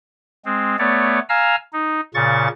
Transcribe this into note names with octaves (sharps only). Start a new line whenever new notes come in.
G#3 C4
A3 B3 C#5 D5
F5 G#5 A#5 E6 F6
D#4
A#2 C#3 C#6 A6